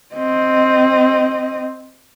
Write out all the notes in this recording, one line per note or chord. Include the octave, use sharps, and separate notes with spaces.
C4 D#5